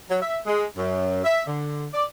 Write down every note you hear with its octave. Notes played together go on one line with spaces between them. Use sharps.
F#3
E5
G#3
F#2
E5
D3
D5